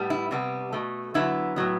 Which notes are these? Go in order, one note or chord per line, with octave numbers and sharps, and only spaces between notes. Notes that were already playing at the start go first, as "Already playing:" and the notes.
Already playing: A2 G3 B3
E4
C3 G3 B3
B2 A3
D3 F#3 B3 E4
A2 F#3 B3